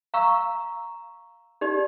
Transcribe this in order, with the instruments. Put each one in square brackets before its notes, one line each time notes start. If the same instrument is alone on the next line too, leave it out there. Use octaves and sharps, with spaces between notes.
[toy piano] F5 A#5 C#6 E6
D#4 G4 D5